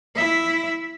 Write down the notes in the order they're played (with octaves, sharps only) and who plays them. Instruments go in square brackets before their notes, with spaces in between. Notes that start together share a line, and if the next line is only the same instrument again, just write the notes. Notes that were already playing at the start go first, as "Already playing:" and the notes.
[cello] E4 E5